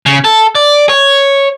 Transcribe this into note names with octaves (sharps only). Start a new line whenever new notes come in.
C#3
A4
D5
C#5